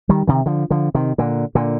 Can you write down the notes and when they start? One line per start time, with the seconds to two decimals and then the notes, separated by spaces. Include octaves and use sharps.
0.09 D#3 G3
0.27 C3 D#3
0.46 D3 F3
0.70 D3 F3
0.95 C3 D#3
1.18 A#2 D3
1.55 A#2 D3